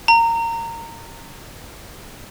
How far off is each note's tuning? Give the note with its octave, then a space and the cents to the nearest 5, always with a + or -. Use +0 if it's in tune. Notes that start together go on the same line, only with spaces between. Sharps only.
A#5 -20